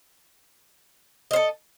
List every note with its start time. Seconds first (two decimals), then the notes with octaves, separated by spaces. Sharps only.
1.31 D#5
1.33 C5
1.36 A4